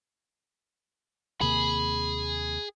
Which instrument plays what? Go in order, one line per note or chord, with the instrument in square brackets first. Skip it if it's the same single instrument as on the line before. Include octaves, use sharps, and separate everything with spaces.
[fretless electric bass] D#2 C3 A#3 [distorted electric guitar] G#4 [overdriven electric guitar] B5